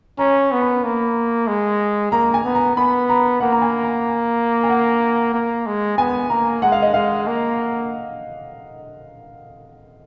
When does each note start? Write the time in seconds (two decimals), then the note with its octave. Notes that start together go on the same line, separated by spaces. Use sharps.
0.19 C#4 A#5
0.52 B3
0.62 B5
0.84 A#3
1.48 G#3
2.12 A#3 A#5
2.34 G#5
2.44 B3
2.55 A#5
2.77 B3 B5
3.09 A#5
3.40 A#3 F#5
3.52 A#5
3.62 G#5
3.83 A#5
4.63 G#5
4.69 F#5
5.34 A#3
5.67 G#3
5.98 B3 G#5
6.30 A#3 A#5
6.62 G#3 F#5
6.72 F5
6.82 D#5
6.94 G#3 F5
7.27 A#3